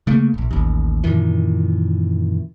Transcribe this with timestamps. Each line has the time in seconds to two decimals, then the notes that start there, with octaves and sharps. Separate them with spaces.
0.07 C#3 A3 A#3
0.34 D#1 A#1
0.51 A1 D#2
1.04 F#2 A#2 D#3 E3